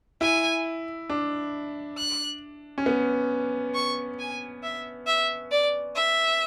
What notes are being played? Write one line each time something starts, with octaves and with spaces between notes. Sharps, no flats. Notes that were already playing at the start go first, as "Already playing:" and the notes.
E4 G#5
D4
F#6
C#4
B3
C#6
G#5
E5
E5
D5
E5